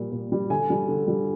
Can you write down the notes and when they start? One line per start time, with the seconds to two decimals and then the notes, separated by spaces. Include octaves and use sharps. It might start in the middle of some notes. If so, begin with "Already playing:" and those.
Already playing: A#2 G3
0.12 A#2
0.32 G3
0.50 D3 G#5
0.70 G3
0.88 D3
1.08 G3